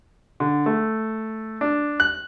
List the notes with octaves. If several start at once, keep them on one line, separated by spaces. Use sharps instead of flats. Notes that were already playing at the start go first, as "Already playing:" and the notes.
D3
A3
D4
F#6